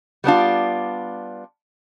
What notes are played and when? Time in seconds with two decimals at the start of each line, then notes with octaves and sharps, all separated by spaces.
0.24 G3 B3 D4 F4